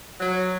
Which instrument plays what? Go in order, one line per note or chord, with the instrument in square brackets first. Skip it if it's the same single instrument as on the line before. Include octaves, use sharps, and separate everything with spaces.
[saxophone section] F#3